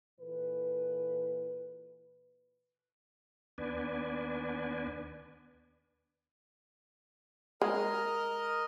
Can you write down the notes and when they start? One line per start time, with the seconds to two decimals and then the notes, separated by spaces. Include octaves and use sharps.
0.20 A#2 E3 A4 B4
3.58 D#2 B3 D4 B4 D5 G#5
7.62 G#3 A#4 D#5 F6